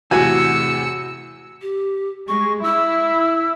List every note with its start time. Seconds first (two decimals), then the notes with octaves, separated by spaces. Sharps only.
0.11 E2 A2 C3 F#4 G#5 E6 C#7
1.62 G4
2.28 G#3 C#6
2.64 E4 E6